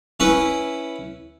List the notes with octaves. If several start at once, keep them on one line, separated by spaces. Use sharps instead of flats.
C#4 E4 B4